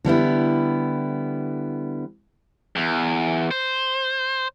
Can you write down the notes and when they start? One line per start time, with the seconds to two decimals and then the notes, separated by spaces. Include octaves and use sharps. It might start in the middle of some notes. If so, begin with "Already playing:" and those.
0.05 D3 G3 B3 E4
2.76 E2
3.51 C5